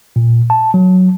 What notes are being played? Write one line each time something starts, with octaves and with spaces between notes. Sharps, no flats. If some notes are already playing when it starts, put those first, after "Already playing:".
A#2
A5
F#3